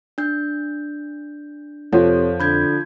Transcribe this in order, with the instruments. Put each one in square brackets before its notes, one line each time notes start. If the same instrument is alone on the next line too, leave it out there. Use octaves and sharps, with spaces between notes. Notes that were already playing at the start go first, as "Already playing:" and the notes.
[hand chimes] D4 G6
[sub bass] F2 [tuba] C3 [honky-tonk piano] F3 [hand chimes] A4 C#5 F#5
[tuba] D3 [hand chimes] B5 G6 G#6